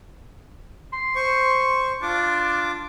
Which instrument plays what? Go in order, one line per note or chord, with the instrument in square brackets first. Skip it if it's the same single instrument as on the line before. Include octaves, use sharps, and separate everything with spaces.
[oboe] C6
[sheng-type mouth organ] C5 C#6
[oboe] D4 [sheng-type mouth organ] F4 D6